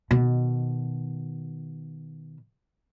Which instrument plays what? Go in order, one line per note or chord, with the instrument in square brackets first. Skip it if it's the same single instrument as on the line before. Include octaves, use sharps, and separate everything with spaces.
[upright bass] B2 D#3